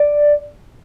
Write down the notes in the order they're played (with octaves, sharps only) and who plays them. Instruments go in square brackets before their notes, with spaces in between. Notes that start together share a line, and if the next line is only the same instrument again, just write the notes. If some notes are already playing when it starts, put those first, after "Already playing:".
Already playing: [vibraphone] D5